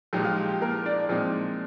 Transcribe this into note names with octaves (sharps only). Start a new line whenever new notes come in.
A#2 F3 G#3 D#4 G4
F4
G4
G4
A#3 A#4
D4 D5
A#2 F3 G#3 C4 D#4